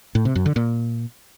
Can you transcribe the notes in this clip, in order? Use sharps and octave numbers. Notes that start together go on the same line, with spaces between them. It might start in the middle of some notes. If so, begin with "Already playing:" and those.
A2
C3
F#2
D3
A#2